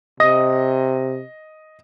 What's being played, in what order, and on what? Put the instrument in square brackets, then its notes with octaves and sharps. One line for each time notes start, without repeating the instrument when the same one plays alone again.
[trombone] C3 [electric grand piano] D#5 D#6 A#6